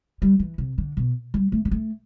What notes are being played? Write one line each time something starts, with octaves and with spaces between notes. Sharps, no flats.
G3
E3
C3
D3
B2
G3
A3
G3
A3